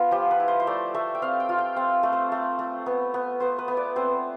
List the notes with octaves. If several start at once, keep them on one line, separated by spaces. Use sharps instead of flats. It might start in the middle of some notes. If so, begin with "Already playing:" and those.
Already playing: B3 F4
F3 G4
B4
E4
C5
C5
A3 D5
A3 E5
G5
C4 F5
G5
F4
G5
C4 F5
A3
C5
A3
A3
B3
B3
B3 C5
B4
B3
D5
C4 C5